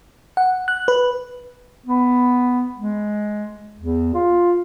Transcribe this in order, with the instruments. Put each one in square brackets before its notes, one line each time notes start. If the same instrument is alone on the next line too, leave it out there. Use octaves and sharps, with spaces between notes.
[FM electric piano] F#5
F#6
B4
[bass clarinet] B3
G#3
E2
F4